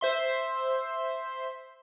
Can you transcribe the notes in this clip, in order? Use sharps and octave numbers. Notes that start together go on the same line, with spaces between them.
C5 E5 C6